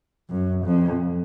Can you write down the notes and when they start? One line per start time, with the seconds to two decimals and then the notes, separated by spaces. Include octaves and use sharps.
0.30 F#2
0.65 F2